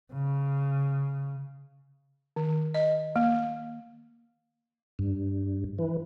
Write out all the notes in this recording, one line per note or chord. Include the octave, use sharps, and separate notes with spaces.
C#3
D#3
D#5
A#3
G2
E3